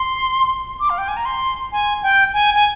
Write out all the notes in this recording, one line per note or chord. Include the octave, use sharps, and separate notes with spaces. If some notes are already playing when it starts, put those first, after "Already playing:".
Already playing: C6
D6
F5
G5
G#5
A#5
C6
G#5
G5
G#5
G#5